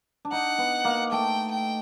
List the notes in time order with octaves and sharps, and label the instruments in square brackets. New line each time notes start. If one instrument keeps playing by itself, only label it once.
[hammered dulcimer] D4
[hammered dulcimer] D#4 [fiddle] F#5
[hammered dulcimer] B3
A#3
[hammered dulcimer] A3 [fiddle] G5
[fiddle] G5